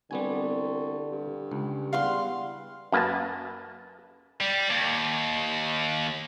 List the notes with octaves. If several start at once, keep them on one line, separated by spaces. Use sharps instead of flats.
C2 D3 G3 B3 G#5
G2
C#2
E2 G3 F5 F#5 C6
F#2 A#3 B4 A5
G3
D#2